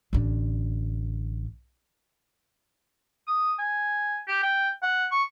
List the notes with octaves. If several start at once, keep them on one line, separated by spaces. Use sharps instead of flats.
A1 D3
D#6
G#5
G4
G5
F#5
C#6